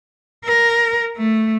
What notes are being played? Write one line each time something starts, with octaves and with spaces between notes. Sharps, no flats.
A#4
A3